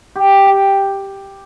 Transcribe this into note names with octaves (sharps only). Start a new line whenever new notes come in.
G4
G5